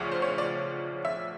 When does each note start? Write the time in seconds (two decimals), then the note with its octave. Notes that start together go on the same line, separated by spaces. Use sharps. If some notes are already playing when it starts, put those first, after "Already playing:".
Already playing: D2 C#3 F3 C#5 D5
0.12 C5
0.22 C#5
0.38 D5
1.05 E5